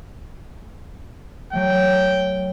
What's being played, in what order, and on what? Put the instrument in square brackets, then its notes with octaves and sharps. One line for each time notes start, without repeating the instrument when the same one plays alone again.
[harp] F#3 A3 [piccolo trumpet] G5